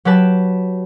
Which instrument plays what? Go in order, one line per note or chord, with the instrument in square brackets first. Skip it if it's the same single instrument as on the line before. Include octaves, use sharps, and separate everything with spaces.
[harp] F#3 G4 B4 A5